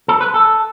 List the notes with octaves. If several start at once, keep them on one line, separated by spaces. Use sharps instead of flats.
A4
B4
A4